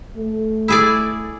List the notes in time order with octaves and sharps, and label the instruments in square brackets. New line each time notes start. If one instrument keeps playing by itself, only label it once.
[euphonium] A3
[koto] E4 G#4 D5